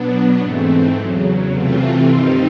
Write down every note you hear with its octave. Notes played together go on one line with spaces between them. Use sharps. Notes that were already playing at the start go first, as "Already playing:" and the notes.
Already playing: B2 F#3 B3 D4
G#2 E3 A3 C4
E2 C#3 F#3
C3 E3 A3 C4 F4
G2 D#3 G3 C4 D#4